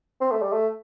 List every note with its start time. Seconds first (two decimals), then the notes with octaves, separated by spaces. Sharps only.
0.21 C4
0.31 A3
0.42 G3
0.52 A3